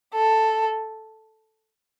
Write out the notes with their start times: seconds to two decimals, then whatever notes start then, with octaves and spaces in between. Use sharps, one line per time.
0.14 A4